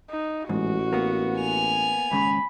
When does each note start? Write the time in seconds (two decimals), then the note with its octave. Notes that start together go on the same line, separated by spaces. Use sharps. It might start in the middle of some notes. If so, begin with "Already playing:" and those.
0.10 D#4
0.49 A1 E2 G#2 F#4
0.93 A#3 B3
1.41 G#5 F7
2.11 D#2 G#2 C#3 B5